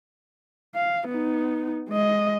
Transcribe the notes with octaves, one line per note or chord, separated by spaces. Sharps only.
F5
B3 D#4
G#3 D#5